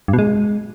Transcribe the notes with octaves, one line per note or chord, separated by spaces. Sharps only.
G2
B2
G#3